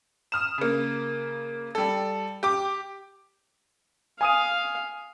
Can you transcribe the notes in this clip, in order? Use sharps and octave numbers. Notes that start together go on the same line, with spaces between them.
D#6 F6 E7
C#3 A#3
G3 A4
G4 D6
F5 G#5 D#6 D#7